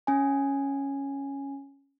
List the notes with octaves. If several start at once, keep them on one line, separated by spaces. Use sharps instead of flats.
C#4 G#5